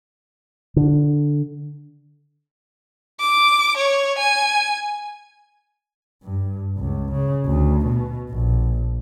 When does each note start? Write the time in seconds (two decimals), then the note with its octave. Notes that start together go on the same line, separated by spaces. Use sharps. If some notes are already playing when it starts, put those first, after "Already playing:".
0.76 D3
3.20 D6
3.77 C#5
4.18 G#5
6.23 G2
6.78 C#2
7.13 C#3
7.45 D2
7.86 B2
8.30 A#1